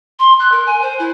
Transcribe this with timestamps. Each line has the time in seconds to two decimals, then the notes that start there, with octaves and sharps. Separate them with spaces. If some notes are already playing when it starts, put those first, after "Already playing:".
0.19 C6
0.39 F#6
0.51 A#4
0.66 G#5
0.81 C5
0.99 E4